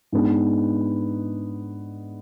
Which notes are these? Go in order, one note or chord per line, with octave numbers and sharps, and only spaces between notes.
G#2 G#3 B3 D4